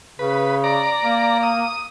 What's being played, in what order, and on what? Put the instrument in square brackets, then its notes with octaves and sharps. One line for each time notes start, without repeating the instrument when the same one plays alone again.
[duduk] C#3 [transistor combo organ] B4
[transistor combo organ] D5 A#5
[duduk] A#3
[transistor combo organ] D#6